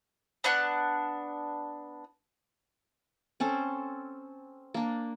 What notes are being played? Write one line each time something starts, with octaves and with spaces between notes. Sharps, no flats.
B3 D4 F#5 F#6
C4 C#4 A4 C5
A#3 D4